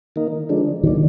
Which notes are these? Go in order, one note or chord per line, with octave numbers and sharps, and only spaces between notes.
D#3 A#3 D#4
D3 F3 G#3 D4
A#2 D#3 F#3 D4